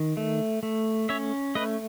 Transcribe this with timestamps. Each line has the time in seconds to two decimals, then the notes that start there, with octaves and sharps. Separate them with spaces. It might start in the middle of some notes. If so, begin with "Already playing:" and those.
Already playing: D#3
0.17 A3
0.63 A3
1.09 C#4 C#5 E5
1.55 A3 B4 D#5